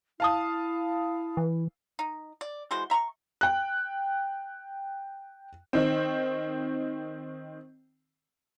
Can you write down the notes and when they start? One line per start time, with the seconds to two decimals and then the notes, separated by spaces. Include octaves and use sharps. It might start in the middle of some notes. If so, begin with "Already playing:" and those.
0.20 E4 F5 A5 D#6
1.37 E3
1.99 D#4
2.41 D5
2.71 E3 G#3 F#4 C5
2.90 E5 A#5 C6 C#6
3.41 G5 F#6
5.73 D#3 C4